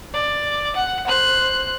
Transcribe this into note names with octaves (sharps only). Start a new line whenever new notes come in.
D5
F#5
C5 F#6